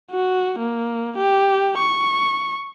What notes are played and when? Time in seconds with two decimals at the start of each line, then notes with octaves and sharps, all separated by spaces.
0.11 F#4
0.59 A#3
1.18 G4
1.78 C#6